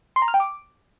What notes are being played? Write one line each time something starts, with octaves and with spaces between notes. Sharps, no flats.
C6
A#5
F6
G5
D6